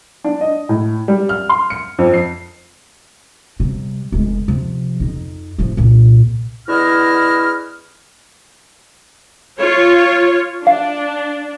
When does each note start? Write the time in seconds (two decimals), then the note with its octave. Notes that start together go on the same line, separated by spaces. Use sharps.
0.24 D4
0.41 D#5
0.69 A2
1.08 G3
1.29 F6
1.49 C6
1.70 C#7
1.99 F2
2.14 C7
3.60 C3 G3
4.12 F1 G#3
4.48 C3 F3
5.00 F2 D#4
5.58 A2 F3
5.77 C2 A#2
6.68 E2 D3 E4 F#4 D#5 F6
9.59 F4 C#5
10.67 D4 F5